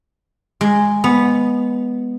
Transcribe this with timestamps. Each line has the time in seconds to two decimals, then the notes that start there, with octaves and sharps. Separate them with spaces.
0.61 G#3
1.04 B3